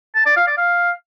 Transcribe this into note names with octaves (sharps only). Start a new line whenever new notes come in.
A5
D5
F5
D5
F5